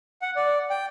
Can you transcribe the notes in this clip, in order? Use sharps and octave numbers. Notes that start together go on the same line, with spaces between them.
F#5
D5
G5